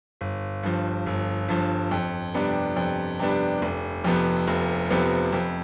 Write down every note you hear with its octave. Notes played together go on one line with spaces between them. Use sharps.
G1
G2 F3
G1
G2 F3
F2
C3 G3 B3 D4
F2
C3 G3 B3 D4
F1
F2 C3 F3 B3
F1
F2 C3 F3 B3
F2